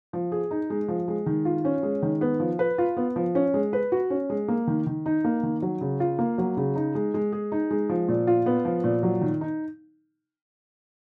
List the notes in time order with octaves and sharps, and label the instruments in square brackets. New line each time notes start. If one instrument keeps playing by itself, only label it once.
[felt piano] F3
G#4
D#4
G#3
F3
G#3
D#3
F4
C#4
G#3
D#3
B3
F3
B4
F4
B3
F3
C#4
G#3
B4
F#4
C#4
G#3
A#3
D#3
D#3
D#4
A#3
D#3
F#3
C#3
F4
A#3
F#3
C#3
D#4
G#3
G#3
G#4
D#4
G#3
F3
A#2
F4
B3
F3
A#2
F#3
D#3
D#4